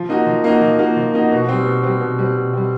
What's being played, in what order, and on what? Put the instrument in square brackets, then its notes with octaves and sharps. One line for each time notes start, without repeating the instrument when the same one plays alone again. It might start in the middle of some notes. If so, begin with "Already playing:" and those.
Already playing: [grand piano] F3
A#3 D#4 F#4
F3
A#3 D#4 F#4
F3
A#3 D#4 F#4
F3
A#3 D#4 F#4
B2
G3 C4
B2
G3 C4
B2
G3 C4
B2
G3 C4